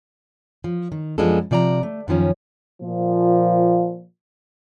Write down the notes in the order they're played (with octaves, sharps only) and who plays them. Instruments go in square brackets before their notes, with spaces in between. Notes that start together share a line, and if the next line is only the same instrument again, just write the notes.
[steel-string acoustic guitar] F3
D#3
F#2 F3 G#3 B3 D4 A4
C3 F3 D5 G#5 A#5
A3
F#2 D#3 F3 C#4
[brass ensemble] A#2 F3